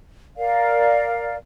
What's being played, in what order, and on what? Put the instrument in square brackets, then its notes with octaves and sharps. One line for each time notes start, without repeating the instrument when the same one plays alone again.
[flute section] A#4 D5 F5